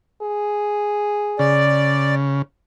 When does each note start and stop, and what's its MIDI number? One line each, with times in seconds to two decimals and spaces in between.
0.22 1.73 68
1.39 2.42 49
1.39 2.15 74